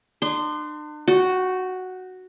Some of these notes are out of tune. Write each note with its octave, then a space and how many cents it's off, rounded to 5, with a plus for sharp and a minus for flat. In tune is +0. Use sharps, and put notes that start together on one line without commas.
D4 +45 C6 -15
F#4 +0 G5 -30